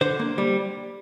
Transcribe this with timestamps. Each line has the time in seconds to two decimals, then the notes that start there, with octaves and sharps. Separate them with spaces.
0.01 D3 C5
0.20 A#3
0.38 G3